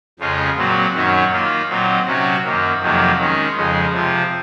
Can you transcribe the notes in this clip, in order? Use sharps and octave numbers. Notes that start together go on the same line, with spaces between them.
F2 C#3 G#3 C#4 F4
A#2 F#3 C4 F#4
F#2 D#3 F#3 C#4
D#3 A#3 F4
A#2 F#3 C4 D#4
C3 F#3 C#4 F#4
F#2 D#3 A#3
F2 C3 D#3 F#3 A#3
D#3 G#3 C#4
F2 C#3 G#3
C3 F3 C4